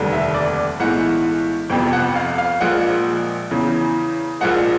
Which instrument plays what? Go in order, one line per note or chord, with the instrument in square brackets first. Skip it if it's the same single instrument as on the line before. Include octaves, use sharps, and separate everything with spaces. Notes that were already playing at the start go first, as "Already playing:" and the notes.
Already playing: [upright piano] F1 D#2 D3 G3
E5
D5
B1 A2 E3 G#3 F#5
G1 F2 C3 G5
F#5
F5
F5
A#1 A#2 F3 G#3 F#5
E2 C#3 E3
A#1 A#2 F3 G#3 F#5